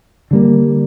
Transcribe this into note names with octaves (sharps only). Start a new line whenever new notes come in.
D3 G3 A#3